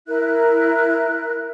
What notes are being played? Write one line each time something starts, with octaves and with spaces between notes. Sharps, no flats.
E4 A#4 E5 F#6